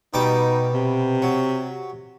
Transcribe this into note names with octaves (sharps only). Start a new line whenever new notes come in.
B2 G3 D#4 D6
C3
F#3